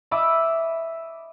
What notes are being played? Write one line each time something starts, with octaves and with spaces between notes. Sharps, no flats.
D#5 E5 B5 D6